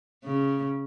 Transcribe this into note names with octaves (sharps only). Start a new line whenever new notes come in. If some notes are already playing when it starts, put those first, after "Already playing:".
C#3